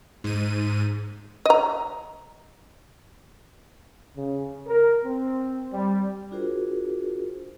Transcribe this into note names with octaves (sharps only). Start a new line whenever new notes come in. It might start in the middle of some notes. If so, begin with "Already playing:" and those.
G#2 D#7
D#5 A#5
C#3
A#4
C4
G3
D4 F4 F#4 G#4 A#4 C5